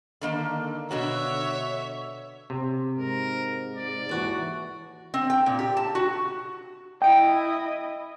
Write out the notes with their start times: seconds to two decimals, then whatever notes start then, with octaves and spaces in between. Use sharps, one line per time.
0.21 D3 D#3 A#3
0.91 B2 D3 F#4 C#5 E5
2.50 C3
2.98 G#2 A#4
3.76 D5
4.09 D#2 E3 F#4
5.14 C4
5.30 G5
5.46 A#2
5.59 G4
5.77 A5
5.95 F#4
7.02 E4 D#5 G5 D7